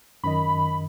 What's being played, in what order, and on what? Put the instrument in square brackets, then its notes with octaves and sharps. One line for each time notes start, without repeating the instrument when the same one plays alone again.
[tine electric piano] F#2 D#3 D#5 [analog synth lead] B5